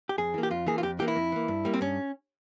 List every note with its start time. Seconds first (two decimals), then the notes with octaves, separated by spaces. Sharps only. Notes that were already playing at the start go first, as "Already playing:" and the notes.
0.09 G4
0.18 F2 G#4
0.34 E3 A#3
0.43 G4
0.50 F2 F4
0.67 E3 A#3 G#4
0.78 F4
0.83 F2 G4
0.99 E3 A#3 G4
1.08 E4
1.16 F2
1.32 E3 A#3
1.48 G2
1.65 G3 A#3
1.74 C4
1.81 G2 C#4